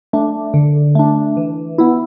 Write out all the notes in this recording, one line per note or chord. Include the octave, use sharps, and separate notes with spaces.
A3 D4
D3
A3 D4
E3
B3 E4